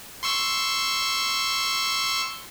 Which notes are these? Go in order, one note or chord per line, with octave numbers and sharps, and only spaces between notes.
C6 C#6 E6